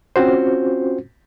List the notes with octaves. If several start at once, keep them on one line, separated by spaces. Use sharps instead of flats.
C4 C#4 F4 F#4 C5